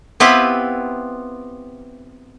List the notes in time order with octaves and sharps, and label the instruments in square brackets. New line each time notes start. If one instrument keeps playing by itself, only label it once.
[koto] B3 C4 E4 F4 G4 B4